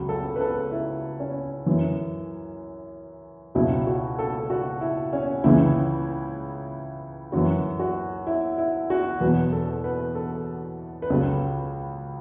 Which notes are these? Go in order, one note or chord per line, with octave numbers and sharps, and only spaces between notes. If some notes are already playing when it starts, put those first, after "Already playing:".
Already playing: C#2 C#3 F#3
A4
B4
A4
E4
C#4
F#2 E3
C#2 B2 F#3 E4
F#4
A4
F#4
E4
C#4
C#2 C#3 E3 E4
F#2 E3 F#4
F#4
E4
E4
F#4
E2 B2 F#3 B4
A4
B4
A4
B4
C#2 C#3 F#3 A4